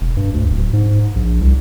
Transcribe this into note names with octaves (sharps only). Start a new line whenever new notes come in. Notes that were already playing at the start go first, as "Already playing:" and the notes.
E1
G2
D2
D1
G#2
A#1
C2